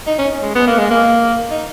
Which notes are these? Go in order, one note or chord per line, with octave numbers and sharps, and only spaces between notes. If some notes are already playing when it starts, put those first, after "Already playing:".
D#4
C#4
G#3
B3
A#3
G#3
A#3
D#4